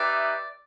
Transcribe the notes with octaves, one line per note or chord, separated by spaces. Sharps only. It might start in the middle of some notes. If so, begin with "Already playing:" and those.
Already playing: D#4 G4 B4 D5 E5